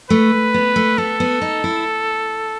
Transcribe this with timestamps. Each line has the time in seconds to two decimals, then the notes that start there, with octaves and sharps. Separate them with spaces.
0.10 A3 B4
0.54 B3
0.76 A3
0.98 B3 A4
1.20 B3
1.42 D#4
1.64 E4